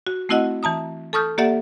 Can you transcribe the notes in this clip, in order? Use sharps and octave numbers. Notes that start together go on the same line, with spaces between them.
F#4
A3 C4 E4 F#4 D#5 F#5
E3 A5 A#5 D#6
A4 A5 C#6 D#6 F6 G6
A#3 G4 A4 D5 E5 F#5